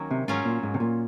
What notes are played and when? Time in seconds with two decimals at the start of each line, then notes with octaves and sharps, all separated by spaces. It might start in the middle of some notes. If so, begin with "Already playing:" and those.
Already playing: D#3 F#3 A#3 C#4
0.11 C3
0.28 G#2 F#3 C#4 F4
0.45 A#2
0.63 G#2
0.74 C3
0.80 A#2